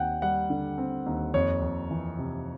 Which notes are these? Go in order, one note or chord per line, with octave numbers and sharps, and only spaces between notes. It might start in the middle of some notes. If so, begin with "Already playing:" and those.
Already playing: D#2 C4 F#5 G5
G3 F#5
D3
C4
D#2
F2 C#5
F2
E3
C3